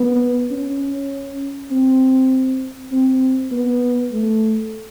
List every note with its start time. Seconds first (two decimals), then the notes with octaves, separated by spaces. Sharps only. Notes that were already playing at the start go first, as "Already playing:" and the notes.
Already playing: B3
0.51 C#4
1.71 C4
2.92 C4
3.51 B3
4.12 A3